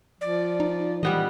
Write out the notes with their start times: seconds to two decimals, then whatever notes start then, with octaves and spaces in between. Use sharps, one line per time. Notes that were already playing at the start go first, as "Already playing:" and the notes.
0.21 F3 D5
0.60 D#4
1.03 E3 G3 B3 D#5